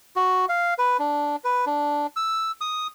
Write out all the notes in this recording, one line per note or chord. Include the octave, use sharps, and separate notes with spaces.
F#4
F5
B4
D4
B4
D4
E6
D#6